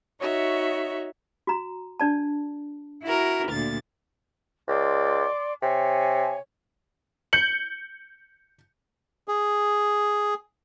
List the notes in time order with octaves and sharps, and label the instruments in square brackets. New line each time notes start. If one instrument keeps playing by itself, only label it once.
[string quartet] D#4 F#4 C#5 E5
[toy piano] F#4 A#5
D4 D5 A5
[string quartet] E4 F#4 A#4
D2 A#2 A6
[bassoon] C#2 [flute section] D5 C6 D6
[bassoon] C3 [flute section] C#5 G#5
[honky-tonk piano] G6 C#7 F#7
[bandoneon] G#4